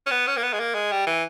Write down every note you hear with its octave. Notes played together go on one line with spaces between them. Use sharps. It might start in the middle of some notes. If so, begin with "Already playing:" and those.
C#4
B3
C#4
A#3
B3
G#3
A#3
G#3
G3
E3